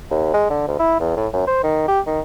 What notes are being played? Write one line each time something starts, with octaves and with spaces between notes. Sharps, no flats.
D#2
G#3
D3
D2
E4
E2
A2
F#2
C5
D#3
G4
D#3